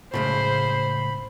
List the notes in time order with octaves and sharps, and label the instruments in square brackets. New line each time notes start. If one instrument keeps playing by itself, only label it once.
[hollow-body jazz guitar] A2 C#3 G#3 [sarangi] C5 [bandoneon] B5